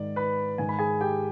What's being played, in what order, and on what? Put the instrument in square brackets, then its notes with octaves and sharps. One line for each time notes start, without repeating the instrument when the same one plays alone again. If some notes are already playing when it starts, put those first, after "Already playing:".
Already playing: [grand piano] G#2 D#3 D5
B4 B5
G#2 D#3 G#5
B5
G#4 G#5
G4 G5